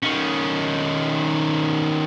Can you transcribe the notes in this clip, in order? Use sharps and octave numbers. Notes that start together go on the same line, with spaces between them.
D#3 C#4